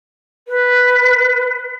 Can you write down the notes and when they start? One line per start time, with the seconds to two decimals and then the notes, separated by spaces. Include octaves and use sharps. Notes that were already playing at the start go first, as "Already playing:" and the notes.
0.47 B4